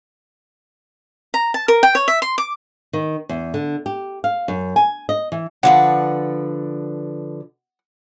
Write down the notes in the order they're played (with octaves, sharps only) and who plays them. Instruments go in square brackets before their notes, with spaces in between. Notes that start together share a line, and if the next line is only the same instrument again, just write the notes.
[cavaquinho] A#5
A5
A#4
G5
C#5
E5
C6
D6
[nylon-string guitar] D#3
E2
D3
G4
F5
F#2
G#5
D#5
E3
[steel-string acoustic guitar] D3 F3 B4 [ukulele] F#5